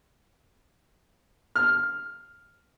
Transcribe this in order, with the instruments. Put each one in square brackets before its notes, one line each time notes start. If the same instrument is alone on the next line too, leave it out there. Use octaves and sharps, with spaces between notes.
[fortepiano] F6